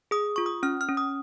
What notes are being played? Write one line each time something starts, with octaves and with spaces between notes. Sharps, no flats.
G#4 D#6
F4 C#6
D#6
C#4 F6
F6
C#4
D#6